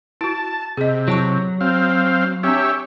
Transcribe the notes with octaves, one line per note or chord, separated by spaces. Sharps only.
E4 F#4 A5
C3 G#4 D#5
F#3 E4 A5 C#6
C4 F5
C4 D4 G4 C#5 E5